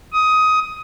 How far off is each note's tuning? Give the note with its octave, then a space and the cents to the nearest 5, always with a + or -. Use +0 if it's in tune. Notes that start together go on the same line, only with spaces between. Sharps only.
D#6 +15